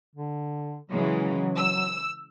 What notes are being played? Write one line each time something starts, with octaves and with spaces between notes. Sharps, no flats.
D3
C#3 E3 F#3 G#3
E6